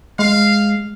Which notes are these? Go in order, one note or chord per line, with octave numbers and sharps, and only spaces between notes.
G#3 F5